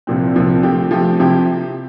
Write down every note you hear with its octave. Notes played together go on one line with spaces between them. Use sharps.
C2 A#2 F3 C4
C2 A#2 F3 C4
F3 A3 C4 G4
F3 A3 C4 G4
C3 F3 C4 E4 G4